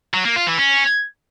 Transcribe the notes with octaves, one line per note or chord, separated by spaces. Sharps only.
F#3
A#3
F4
E3
C#4